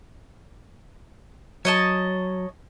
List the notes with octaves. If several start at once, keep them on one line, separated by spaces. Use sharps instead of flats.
F#3 C#5 D#5 A5